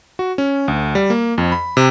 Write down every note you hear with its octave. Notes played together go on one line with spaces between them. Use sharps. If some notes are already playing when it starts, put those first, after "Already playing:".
F#4
C#4
D2
G3
A#3
F2
B5
C3